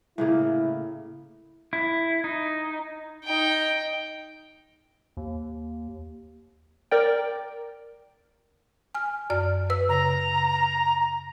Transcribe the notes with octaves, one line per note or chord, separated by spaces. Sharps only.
A2 C#3 A#3 E4
E4
D#4
D#4 G5
D#2
A#4 D5 G5
G#5 F6
F#2 D5 F6
B4 E6
C#3 A#5